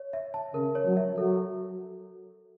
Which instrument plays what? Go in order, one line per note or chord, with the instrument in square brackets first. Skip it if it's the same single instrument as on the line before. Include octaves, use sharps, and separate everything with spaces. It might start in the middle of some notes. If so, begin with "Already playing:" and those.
Already playing: [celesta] C#5
E5
A5
[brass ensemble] C#3 [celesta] A#4
[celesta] C#5
[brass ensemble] F#3
[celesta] E5
[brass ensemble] F#3 [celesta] A4